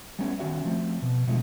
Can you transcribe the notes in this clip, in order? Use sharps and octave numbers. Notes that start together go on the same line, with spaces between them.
G3 A3 B3 C#4
D#3 C#4 F#4 E5
F3 A3 C4
B2
B2 D3 F3 G#3 A3